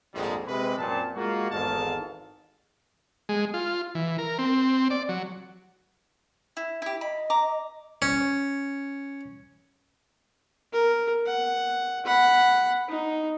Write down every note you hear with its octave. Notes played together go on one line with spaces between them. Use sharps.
A#1 F2 G#2 D#3 G3 G#3
C3 G#3 B4
F#2 A#2 C4 A5
G#3 A#3 F4 F#4
G#1 E2 G#2 A4 F5 A5
G#3
F4
E3
A#4
C4
D5
F#3
E4
E4 G4
D#5 B5
A#5 D6
C#4
A#4
F#5
F#5 B5
D#4